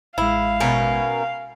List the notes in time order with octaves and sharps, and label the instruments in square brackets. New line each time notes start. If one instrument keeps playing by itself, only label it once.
[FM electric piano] A1 G#3 [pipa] E4 [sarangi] F5
[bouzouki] B2 C#4 A#4